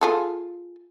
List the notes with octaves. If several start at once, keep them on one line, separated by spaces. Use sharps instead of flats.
F4 G#4 A4